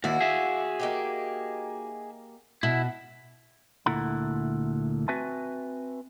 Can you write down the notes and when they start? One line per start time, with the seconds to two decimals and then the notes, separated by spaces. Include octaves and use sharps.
0.04 D#2 D4 E4 F#4 F5
0.21 G#4 E5
0.80 A#3 D#4 G4
2.63 B2 E4
3.86 D2 A#2 E4 A4 F#5 A#5
5.08 C4 F#4 B4 E5 G#5 A5